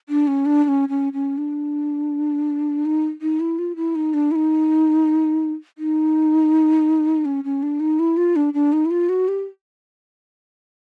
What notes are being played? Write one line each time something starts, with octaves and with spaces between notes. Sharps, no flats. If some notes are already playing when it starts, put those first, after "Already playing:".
D4
C#4
D4
D4
C#4
C#4
C#4
D4
D#4
D#4
E4
F4
E4
D#4
D4
E4
D#4
D#4
C#4
C#4
D4
D#4
E4
F4
D4
D4
D#4
E4
F4
F#4
G4